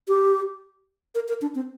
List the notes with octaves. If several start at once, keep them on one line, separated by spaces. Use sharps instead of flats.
G4
A#4
A#4
D4
C4